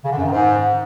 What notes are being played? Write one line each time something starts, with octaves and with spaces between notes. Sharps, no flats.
C#3
D3
F#2
D#3
G#2